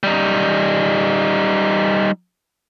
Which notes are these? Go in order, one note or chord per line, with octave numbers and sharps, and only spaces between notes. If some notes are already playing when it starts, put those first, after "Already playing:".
G3 D#4